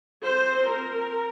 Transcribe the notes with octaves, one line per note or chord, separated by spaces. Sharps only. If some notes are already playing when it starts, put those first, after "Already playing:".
F3 C4 C5
A#4